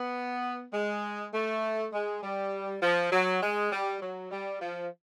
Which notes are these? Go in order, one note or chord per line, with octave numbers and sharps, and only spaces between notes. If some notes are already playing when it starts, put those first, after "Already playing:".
Already playing: B3
G#3
A3
G#3
G3
F3
F#3
G#3
G3
F#3
G3
F3